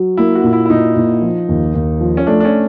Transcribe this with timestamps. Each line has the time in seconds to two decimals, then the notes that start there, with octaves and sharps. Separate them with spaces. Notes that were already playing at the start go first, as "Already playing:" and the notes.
Already playing: F#3
0.17 A#3 E4
0.35 F#4
0.44 A#2
0.53 E4
0.65 E4
0.70 A#2 D#4
0.96 A#2
1.22 F3
1.49 D#2
1.75 D#2
2.01 F3
2.17 C#4
2.27 A3 D4
2.40 D4
2.45 C#4